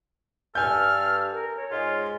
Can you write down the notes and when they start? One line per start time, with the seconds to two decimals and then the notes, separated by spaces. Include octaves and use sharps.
0.55 G2 A4 G#5 F6 G6
1.32 A#4
1.57 C#5
1.71 G#2 G#3 F4